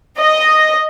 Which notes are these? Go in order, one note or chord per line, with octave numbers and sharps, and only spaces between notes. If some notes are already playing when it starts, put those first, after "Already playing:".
D#5